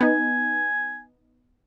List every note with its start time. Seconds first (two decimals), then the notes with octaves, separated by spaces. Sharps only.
0.01 B3 D#4 G#5